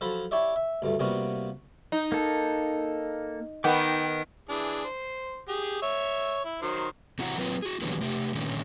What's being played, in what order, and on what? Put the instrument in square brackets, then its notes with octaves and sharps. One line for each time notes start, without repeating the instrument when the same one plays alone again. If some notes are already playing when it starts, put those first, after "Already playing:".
[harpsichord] F3 F#3 A4 C5 B5
E4 G4 C#5 D5 E5
E5
D2 G2 A3
C3 G3 A#3 B3 F4 F#4
[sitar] D#4
[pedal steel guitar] A#3 A4
[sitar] D#3 B3 [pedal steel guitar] A#4 G5 D6
[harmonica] E3 D4 G#4
C5
G4 G#4
C#5 E5
E4
D#3 F#3 C5
[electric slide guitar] C3 E3 E4 F#4 F#5 A#5
F#3 A#3 C4 F4 A#4 B4
F#4 G#4
B2 D3 E3 F#3 G3 A#3
C3 A3 G4
A#2 D3 D#3 A3 C#4